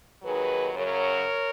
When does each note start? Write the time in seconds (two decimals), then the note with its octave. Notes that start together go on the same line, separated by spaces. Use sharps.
0.23 D#2 D#3 F#3 G#4 B4
0.74 F#2 C#3 F#3 A#4 C#5